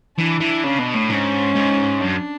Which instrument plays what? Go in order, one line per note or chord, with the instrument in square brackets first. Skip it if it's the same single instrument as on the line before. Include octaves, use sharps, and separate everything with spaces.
[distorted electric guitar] E3 [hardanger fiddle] D4
[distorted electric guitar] E3
C#3
B2
A2
[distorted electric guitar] G#2 [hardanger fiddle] C#4
[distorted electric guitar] G#2
[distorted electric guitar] F#2 [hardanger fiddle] D4